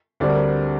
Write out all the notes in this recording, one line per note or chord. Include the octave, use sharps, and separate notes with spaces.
D2 D3 G3 C4 D5
A#4